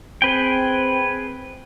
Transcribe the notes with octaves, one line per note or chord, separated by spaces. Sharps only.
C4 G#4 B4 G5